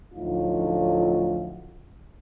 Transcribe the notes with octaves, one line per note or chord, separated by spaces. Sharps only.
D2 A2 F3 F#3 D#4 F4